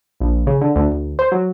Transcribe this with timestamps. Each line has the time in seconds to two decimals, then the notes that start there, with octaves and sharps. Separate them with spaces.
0.20 A#1
0.47 C#3
0.61 D3
0.76 D2
0.92 D2
1.19 C5
1.32 F#3